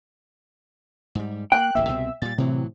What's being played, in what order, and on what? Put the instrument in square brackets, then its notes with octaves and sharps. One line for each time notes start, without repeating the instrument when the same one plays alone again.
[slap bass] G#2 G3
[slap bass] A#3 [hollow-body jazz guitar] G5 [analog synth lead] F#6
[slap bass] D1 A1 A#3 [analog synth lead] E5
[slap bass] C2 B2 C4
[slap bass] A#2 G3 [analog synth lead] A6
[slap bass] A2 E3 F#3 [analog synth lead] C3